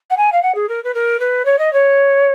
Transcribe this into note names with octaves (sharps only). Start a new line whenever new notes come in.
F#5
G#5
F5
F#5
G#4
A#4
B4
A#4
B4
C#5
D#5
C#5